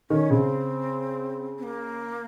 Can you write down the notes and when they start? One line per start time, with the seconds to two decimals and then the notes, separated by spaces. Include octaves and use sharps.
0.10 D#3 C#4
0.30 C#3 C4
1.58 C4
1.63 A#3